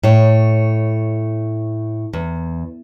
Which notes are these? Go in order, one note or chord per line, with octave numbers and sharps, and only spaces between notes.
A2 C#5
E2